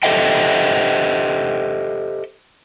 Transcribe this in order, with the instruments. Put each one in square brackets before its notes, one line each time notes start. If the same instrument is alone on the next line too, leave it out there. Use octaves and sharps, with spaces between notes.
[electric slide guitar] G4 A4 C5 D#5 E5 G5